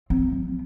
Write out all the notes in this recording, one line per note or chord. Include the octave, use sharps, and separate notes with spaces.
C4
F3